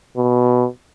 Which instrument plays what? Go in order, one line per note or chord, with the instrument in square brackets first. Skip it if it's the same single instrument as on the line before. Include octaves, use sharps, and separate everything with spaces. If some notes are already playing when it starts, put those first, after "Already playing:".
[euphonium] B2